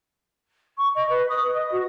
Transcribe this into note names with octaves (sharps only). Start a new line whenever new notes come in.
C#6
D#5
B4
D#6
D#5
F#4